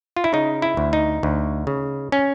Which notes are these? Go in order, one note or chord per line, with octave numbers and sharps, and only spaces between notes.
F4
E4
C#3 D#4
E4
D2
D#4
D2
C#3
C#4